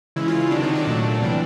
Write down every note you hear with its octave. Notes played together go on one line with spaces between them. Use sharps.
C#3 E3 G#3 E4
F4
F4
C3 D#3 F#3 D4
D#4
D4
A#2 F#3 A3
C3 E3 G3